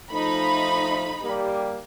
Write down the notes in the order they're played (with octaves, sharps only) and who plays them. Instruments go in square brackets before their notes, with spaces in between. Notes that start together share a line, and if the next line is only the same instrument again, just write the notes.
[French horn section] F3 A3 [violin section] D#4 B5
[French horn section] G3 A#3 G4